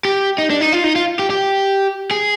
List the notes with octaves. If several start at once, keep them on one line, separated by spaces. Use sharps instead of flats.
G4
D#4
D4
D#4
F4
D#4
F4
G4
G4
G#4